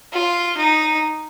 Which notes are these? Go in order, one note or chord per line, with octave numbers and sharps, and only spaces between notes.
F4
D#4